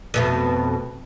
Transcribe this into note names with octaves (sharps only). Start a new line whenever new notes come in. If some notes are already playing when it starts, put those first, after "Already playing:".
F2 B2 A3